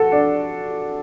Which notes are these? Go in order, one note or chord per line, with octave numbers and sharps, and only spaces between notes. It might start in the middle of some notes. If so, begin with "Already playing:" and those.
Already playing: F#4 A4
D4